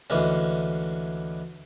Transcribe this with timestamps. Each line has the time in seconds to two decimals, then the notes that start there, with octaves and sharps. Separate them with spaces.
0.10 D2 E3 G#3 C#4